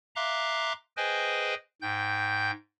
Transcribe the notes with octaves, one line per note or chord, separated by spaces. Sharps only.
E5 F5 A#5 C6 D6 F#6
G#4 B4 C5 D#5 G5 G#5
G#2 G5 G6